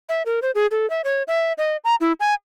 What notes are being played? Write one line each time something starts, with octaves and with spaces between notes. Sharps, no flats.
E5
A#4
C5
G#4
A4
E5
C#5
E5
D#5
A#5
E4
G#5